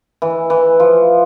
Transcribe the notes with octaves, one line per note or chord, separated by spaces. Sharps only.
E3
E3
F3